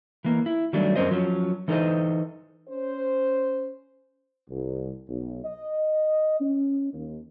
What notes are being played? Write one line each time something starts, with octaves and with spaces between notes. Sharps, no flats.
E3 A#3
E4
D#3 F#3 G3 A3 D4
F#2 C4 C#4 A#4 C5 D#5
F3 F#3 C#4
E3 D#4 A4 A#4 C5 D#5
C#4 C5
C2
B1
D#5
C#4
D#2